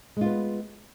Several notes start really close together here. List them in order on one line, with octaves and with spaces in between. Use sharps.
G#3 F4 B3